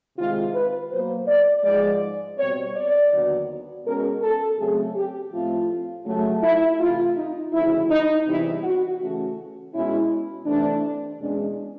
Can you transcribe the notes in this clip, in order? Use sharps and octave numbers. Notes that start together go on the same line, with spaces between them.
C3 D#3 G#3 F4
B4
B2 F#3 A#3 C5
D5
G#2 F3 G#3 D5
B2 G3 C4 C#5
D5
D#2 D3 F#3 B3
B2 G#3 C#4 A#4
A4
C#3 F#3 A3 C4 G#4
G4
A2 F3 A3 C4 F4
C#3 F#3 A3
E4
C3 E3 A3 F4
D#4
D2 C#3 F3 E4
D#4
E2 C3 E3 G3 E4
F#4
C#3 E3 A3 C#4 F#4
B2 G#3 C#4 E4
C3 E3 A3 D4
E2 B2 G#3 C#4 D4